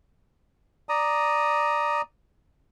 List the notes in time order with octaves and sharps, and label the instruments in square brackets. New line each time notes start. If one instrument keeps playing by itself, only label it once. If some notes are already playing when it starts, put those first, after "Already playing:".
[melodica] D5 A#5 D#6